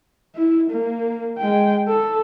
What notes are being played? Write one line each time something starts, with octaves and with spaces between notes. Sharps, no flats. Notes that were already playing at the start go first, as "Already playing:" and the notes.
E4
A#3
G#3 G5
A4